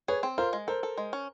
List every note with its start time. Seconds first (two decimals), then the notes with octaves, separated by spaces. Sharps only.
0.08 G#4 B4 C#5
0.23 C4
0.38 F4 A#4 C5
0.53 G#3
0.68 A4 A#4 C5
0.83 A4
0.98 G#3
1.13 C#4